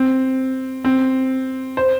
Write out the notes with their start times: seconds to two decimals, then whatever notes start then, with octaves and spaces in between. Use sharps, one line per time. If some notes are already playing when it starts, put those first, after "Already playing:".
Already playing: C4
0.84 C4
1.77 C5